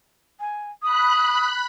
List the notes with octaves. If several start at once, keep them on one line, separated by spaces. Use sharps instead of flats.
G#5
B5 D#6 F#6